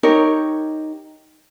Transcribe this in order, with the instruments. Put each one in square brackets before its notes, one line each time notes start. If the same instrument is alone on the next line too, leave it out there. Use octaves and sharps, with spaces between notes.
[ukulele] D#4 G4 A#4 C#5